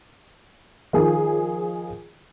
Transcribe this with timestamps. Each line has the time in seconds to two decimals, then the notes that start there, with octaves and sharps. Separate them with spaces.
0.93 D#3 F3 G#4